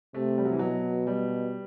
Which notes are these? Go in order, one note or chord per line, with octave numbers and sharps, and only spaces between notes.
C3 A3
G3
F#3
E3
B2 F#3
G3